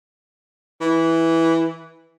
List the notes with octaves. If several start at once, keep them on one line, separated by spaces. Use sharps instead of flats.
E3